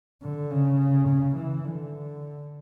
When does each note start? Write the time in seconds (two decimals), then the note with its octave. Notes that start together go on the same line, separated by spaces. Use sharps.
0.22 D3
0.50 C#3
1.08 C#3
1.36 E3
1.65 D3